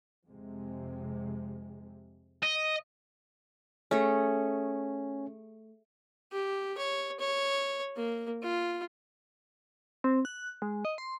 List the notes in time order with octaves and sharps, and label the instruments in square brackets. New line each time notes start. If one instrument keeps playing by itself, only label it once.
[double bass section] F2 C3 G#3
[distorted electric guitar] D#5
[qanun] A3 G#4 [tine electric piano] C#4
[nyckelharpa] G4
C#5
C#5
A#3
F4
[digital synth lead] C4
F#6
G#3
D#5
C6